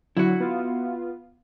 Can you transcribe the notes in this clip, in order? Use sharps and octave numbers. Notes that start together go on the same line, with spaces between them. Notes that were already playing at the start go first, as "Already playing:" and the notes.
D3 F#3 E4 F#4
B3 F4